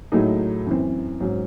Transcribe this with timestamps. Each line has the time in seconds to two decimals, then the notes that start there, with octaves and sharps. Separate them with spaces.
0.12 A2 F#3 A3 D#4 G#4
0.66 F#2 E3 C4
1.20 G#2 F#3 C#4